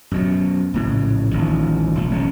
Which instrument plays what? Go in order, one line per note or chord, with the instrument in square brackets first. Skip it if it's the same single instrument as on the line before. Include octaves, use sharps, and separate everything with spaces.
[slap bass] F#2 B2 F#3
A#1 A2 C#3
D#1 A1 D#3 F3
E1 B1 F3
E1 F2 G#3 C#4